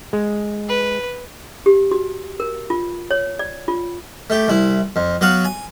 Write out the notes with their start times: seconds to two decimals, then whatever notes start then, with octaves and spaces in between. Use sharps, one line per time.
0.13 G#3
0.69 B4
1.66 G4
1.91 F#4
2.40 A#4
2.70 F4
3.11 C#5
3.39 D5
3.68 F4
4.30 A3 G4
4.48 C2 E4
4.96 F2
5.21 F#3 B3 F#4 F5
5.44 G#5